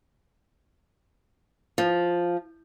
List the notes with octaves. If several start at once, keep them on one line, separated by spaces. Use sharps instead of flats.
F3